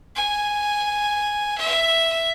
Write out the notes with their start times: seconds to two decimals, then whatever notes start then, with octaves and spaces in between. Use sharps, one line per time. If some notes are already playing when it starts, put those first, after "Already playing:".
0.16 G#5
1.58 E5